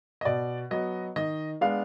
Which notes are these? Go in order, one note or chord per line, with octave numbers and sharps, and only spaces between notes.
D#5
B2 D5
F#3 B3 D#5
D#3 D#5
G#3 B3 D4 F5